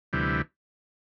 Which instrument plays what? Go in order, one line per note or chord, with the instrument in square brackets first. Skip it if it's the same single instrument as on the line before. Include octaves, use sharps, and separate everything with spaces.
[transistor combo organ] D2 C3 E3 G3